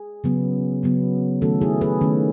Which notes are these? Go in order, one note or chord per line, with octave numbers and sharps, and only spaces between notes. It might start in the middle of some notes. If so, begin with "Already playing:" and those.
Already playing: G#4
C#3 F#3 B3
C#3 F#3 B3
D#3 A3 C#4 F#4 A4
E4 G#4
G#4 B4
D#3 A3 C#4